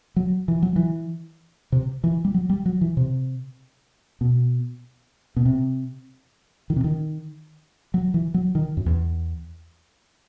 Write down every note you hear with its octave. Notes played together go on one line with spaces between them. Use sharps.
F#3
E3
F#3
E3
C3
E3
G3
F#3
G3
F#3
E3
C3
B2
B2
C3
D#3
C3
D#3
F#3
E3
F#3
D#3
F#2
E2